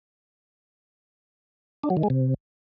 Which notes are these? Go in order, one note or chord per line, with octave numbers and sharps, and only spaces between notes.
D4
F#3
D#3
G#3
C3